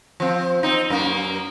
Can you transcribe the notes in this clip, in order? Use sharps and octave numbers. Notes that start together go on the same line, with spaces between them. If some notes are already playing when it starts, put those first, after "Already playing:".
F3 C4
C4 D#4
F#2 A#3